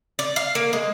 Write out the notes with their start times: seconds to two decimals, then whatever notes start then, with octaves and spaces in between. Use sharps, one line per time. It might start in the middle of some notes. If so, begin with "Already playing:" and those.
0.19 D5
0.36 F5
0.55 A#3
0.73 G#3